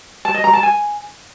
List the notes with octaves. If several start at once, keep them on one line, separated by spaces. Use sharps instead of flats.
A5
D#5
A#5
A5
G#5